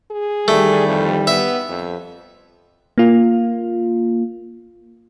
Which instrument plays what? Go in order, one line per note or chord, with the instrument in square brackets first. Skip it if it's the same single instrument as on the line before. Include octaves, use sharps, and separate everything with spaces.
[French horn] G#4
[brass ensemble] D#3 E3 G3 [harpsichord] A3
[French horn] F2
[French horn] B3 [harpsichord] E5
[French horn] F2
[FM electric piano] A#3 F4